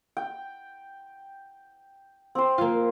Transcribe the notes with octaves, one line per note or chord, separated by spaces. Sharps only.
G5
C4 C5
A#3 F4